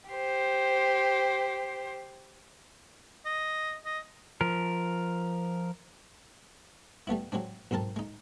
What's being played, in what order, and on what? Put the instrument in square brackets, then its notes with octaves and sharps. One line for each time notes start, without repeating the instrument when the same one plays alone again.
[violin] G4 C5
[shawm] D#5
D#5
[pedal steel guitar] F3 A#4
[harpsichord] G3 A3 B3 E4
F#3 G#3 C4 D4
B1 G#2 C4 A#4 A5
G#3 D#4